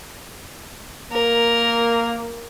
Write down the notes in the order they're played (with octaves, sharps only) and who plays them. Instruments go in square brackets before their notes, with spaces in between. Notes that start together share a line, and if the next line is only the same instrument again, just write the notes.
[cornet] A#3 [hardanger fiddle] A#4